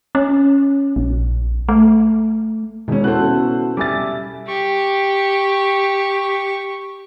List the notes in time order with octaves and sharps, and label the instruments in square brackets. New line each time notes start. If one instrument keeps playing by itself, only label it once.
[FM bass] C#4
A#1
A3
[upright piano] E1 C#4 [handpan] B2 [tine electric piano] D#3 G#3
[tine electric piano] B3 E4 F#4 [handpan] C#4 A4 [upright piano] C5 F#6
[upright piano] G3 A6 [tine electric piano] E5 G#5 D6
[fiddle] G4 [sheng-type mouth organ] C#6